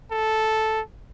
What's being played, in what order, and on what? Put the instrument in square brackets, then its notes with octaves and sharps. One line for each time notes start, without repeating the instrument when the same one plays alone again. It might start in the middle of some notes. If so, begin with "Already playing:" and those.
[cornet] A4